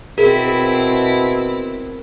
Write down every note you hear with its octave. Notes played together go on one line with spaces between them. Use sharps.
B2 C4 E4 G#4 A#4